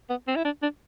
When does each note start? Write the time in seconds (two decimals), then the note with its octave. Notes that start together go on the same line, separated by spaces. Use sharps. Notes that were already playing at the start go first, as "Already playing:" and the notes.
0.10 B3
0.27 C4
0.36 E4
0.45 D4
0.62 D4